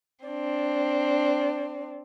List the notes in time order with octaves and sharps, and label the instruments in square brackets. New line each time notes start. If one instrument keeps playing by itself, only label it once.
[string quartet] C4 D4